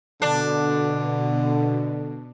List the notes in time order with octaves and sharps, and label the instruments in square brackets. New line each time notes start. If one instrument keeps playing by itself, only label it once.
[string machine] B2 [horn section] D3 [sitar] D4